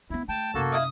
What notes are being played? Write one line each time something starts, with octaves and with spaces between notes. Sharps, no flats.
B3 C#4 E4
A3 G5 A5
F#2 C3 A#3 F#4 A4
E4 D#5 F5 D#6